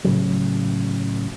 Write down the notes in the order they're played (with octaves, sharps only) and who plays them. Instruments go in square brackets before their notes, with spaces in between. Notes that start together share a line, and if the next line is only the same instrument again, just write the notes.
[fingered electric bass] A2 C#3 F#3